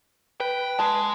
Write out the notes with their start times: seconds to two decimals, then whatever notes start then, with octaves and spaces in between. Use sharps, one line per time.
0.40 B4 G5
0.79 G#3 A5